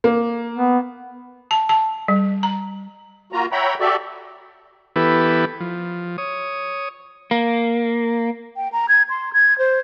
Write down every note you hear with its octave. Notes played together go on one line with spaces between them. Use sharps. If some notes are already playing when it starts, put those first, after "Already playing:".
A#3
B3
A5
A5
G3
A#5
A#3 F4 F#4 A#5
C#5 E5 F#5 G5 A#5 B5
F#4 G4 A4 D5 E5
E3 B3 E4 G4 A4 B4
F3
C#5 D#6
A#3
G5
A#5
G#6
C6
G#6
C5